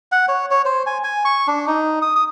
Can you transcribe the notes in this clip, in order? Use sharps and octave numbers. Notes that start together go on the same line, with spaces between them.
F#5
C#5
C#5
C5
G#5
G#5
C#6
D4
D#4
D#6
D#6